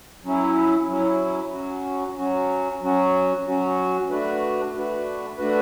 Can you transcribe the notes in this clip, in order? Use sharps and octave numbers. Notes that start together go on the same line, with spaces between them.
F#3 C#4 E4
F#3 C#4 E4
F#3 C#4 F#4
F#3 C#4 F#4
F#3 C#4 F#4
F#3 C#4 F#4
A3 D4 F#4 B4
A3 D4 F#4 B4
A3 D4 F#4 B4